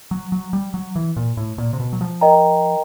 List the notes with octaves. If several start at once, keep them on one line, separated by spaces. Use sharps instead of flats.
F#3
F#3
G3
F#3
E3
A#2
A2
A#2
C3
B2
F#3
F3
A#4 D#5 G5 A#5